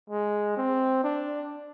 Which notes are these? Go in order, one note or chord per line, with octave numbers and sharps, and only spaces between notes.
G#3
C4
D4